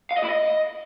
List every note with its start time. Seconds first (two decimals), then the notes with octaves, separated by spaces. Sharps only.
0.11 F5
0.17 D#5
0.23 E4
0.30 D#5